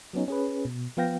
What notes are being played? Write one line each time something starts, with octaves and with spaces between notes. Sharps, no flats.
F#3 B3 C#4 D#4
C#4 G#4 B4
B2
F3 B3 F5 G5 A#6